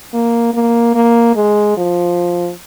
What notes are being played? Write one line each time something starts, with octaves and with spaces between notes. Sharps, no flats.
A#3
A#3
A#3
G#3
F3